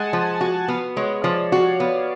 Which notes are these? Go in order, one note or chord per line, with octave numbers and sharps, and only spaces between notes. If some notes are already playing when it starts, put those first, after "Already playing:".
Already playing: G#3 F#5 G#5 A5
F3
G#5
F#4
B3 F5
G#3 C#5
F3 D5
F#4 F5
B3